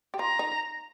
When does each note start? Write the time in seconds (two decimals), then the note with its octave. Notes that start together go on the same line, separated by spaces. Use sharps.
0.14 G4
0.19 F4 A#5
0.39 D#4